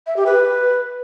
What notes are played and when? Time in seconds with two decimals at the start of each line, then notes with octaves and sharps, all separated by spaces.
0.07 E5
0.16 G4
0.26 B4